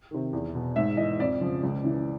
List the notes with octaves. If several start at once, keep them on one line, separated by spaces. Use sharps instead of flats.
C3 D#3
E2
B2
G#2 E5
E3 D#5
F2 D5
C#3 F3
C#2
C#3 E3